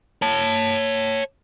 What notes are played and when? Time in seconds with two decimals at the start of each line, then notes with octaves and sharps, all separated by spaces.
0.22 C#5 A5